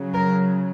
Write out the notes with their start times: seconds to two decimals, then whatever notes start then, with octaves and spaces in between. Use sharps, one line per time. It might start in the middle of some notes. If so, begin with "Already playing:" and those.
Already playing: C#3 F#3
0.13 A#4